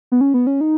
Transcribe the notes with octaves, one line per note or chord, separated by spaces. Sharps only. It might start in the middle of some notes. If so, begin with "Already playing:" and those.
B3
C#4
B3
C#4
D#4